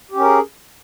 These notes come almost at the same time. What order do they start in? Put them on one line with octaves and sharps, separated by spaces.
G4 C#4 A#4 G#4